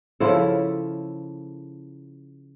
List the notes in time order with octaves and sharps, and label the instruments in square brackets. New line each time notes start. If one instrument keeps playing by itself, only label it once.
[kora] C#3 F3 E4 A4